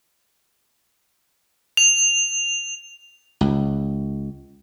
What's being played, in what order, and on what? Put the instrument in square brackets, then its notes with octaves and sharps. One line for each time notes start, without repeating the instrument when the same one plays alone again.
[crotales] F7
[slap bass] C#2